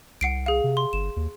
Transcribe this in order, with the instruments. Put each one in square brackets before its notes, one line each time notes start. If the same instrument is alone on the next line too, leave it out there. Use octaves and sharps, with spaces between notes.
[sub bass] C2 [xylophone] F#5 C7 D7
[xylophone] G#4 F5
[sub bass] C3
[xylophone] C6
[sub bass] G1 [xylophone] E7
[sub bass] D#2